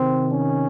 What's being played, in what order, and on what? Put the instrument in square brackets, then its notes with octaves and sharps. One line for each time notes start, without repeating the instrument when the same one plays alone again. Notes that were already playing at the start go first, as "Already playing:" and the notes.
Already playing: [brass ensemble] C3 D#3 C4
C#4